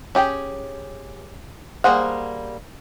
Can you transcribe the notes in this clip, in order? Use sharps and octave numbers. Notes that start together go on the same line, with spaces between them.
C#4 G4 G#4 G5
G3 A#3 G#4 C5 F#5